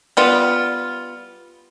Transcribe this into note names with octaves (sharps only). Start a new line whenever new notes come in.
G3 B3 F4